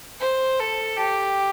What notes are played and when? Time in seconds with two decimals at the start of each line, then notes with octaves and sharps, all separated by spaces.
0.20 C5
0.60 A4
0.97 G4